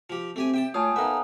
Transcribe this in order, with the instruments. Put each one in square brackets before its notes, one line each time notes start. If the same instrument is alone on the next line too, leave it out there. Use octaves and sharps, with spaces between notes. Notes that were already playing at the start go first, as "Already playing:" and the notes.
[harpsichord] F3 G4
[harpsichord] A3 G4 G#5 [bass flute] C4
[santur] G4 [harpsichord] E5 G5 A5
[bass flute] A3 [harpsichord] F4 [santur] C#5 [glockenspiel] G#5 A5 D#6
[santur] A#3 B3 [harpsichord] D#4 E5 [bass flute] A4